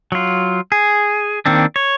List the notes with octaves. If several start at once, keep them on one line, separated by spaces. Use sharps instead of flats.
F#3 F4
G#4
D#3 A#3 C4 D4
C#5